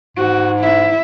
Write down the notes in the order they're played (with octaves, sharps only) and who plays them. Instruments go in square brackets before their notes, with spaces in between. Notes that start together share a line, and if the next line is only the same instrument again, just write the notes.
[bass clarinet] G#2 [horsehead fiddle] F#4
[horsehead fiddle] E4 E5